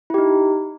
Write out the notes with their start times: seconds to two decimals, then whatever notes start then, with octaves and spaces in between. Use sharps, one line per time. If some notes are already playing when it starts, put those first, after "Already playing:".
0.10 E4
0.14 G4
0.18 D#4